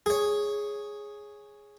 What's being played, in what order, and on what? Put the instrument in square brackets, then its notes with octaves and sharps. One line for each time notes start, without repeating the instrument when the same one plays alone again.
[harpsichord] G#4 C#5